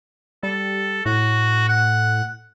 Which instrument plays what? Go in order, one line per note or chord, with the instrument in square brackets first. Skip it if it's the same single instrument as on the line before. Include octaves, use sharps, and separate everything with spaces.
[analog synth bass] G3 [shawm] A4
[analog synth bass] A2 [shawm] F#4
[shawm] F#5